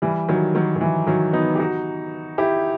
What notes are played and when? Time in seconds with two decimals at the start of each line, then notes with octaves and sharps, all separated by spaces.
0.02 E3 G3
0.29 D#3 F#3
0.55 D#3 F#3
0.76 D#3
0.81 E3
1.07 D#3 F#3
1.33 B3 D#4
1.55 G4
1.59 D#4 F#4
2.38 E4 G4